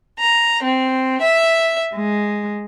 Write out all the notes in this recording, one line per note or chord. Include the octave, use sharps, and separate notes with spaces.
A#5
C4
E5
G#3